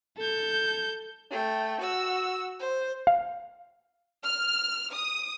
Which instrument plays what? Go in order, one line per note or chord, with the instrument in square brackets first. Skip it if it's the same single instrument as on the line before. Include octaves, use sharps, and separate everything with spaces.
[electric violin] A4 G6
[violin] A3 G5
F#4 E6
C5
[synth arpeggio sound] F5
[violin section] F6
D#6